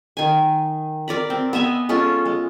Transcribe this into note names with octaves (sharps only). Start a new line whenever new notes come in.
D#3 G#5
A#4 D5 A#5 B5
C4
B3 D#5 E5 G#5
G#3 C#4 F4 A4
G#3